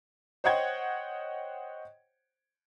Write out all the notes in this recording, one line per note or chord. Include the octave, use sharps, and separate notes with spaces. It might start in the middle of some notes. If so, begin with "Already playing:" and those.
C5 C#5 D#5 F#5 G5 G#6